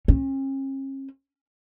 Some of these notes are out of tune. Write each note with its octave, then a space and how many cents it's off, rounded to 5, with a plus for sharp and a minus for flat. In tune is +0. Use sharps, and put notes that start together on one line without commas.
C#4 -45